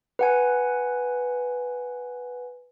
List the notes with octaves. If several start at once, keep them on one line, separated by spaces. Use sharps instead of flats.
B4 F#5 G#5